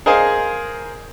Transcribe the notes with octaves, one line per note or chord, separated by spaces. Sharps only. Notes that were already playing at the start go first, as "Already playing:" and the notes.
G#4 A#4 C5 D#5 F5 G#5